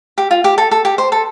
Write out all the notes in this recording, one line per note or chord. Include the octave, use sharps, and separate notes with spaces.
G4
F4
G4
A4
A4
G4
C5
A4